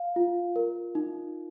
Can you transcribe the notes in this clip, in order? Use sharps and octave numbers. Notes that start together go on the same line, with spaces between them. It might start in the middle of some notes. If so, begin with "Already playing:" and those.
Already playing: F5
F4
A#4
D#4